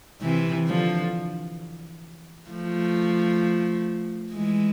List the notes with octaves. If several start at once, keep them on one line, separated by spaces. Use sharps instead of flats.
C3 E3
D3 F3
F3 A3
E3 G#3